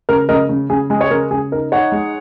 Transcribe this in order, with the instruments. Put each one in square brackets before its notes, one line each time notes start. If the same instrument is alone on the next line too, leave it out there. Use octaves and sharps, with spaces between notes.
[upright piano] C#3 A#4
C#3 A#4 D#5
C#3
C#3 G#4
G#3 G#4
C#5
C#3 A#4
C#3 G#4
D#4 A#4
D#4 C#5 F#5
G#3